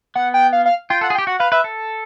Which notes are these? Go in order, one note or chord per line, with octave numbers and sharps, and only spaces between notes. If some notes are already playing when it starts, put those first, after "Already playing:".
B3 F#5
G5
F5
F5
F4 G5
A4 F#5
G#4
G4 G5
F#4 F#5
B4 F5
B4 E5
A4